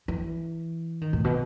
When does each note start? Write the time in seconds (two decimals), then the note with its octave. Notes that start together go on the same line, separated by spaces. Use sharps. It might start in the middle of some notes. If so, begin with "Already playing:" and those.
0.08 E3
1.01 D#3
1.13 A2
1.24 B2